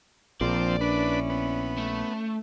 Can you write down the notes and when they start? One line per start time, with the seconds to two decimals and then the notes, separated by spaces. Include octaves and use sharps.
0.41 A#1 F3 C4 D5
0.81 C#4 D4 E4 B4
1.30 B3
1.78 A3